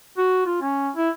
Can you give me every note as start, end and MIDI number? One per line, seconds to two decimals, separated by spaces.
0.18 0.41 66
0.46 0.61 65
0.62 0.89 61
0.96 1.09 64